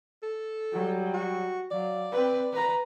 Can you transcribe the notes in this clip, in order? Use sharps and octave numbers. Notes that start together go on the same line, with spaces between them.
A4
F#3 G3
F#4
F#3 D5 F5
C4 B4
B4 A#5